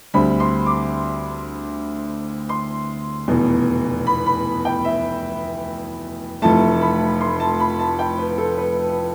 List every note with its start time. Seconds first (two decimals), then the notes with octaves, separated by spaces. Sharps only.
0.14 D2 D3 G3 C4 B5
0.40 C6
0.66 D6
2.49 C6
3.28 F1 E2 B2
4.07 B5
4.26 B5
4.65 G5
4.85 E5
6.42 F1 F2 E3 A3 A5
6.81 B5
7.21 C6
7.40 A5
7.60 B5
7.79 A5
7.99 G5
8.19 B4
8.38 A4
8.58 B4